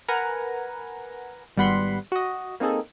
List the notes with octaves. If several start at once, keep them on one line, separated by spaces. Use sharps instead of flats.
A#4 B4 F#5 G#5 A#5
G#1 G3 B3 F#5 B5 C6
F#4 D#5
A#3 C4 D#4 G#4 A4